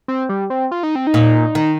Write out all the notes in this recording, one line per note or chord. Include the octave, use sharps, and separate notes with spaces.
C4
G3
C4
F4
D#4
C4
D#4
A#2
D#3